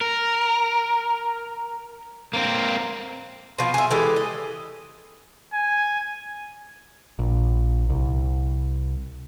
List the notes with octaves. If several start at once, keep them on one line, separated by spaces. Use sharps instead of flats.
A#4
A#3 C4
B2 F3 C6
G#4 E5
E3 G#3 G4 A4
D#5
G#5
A#1
C2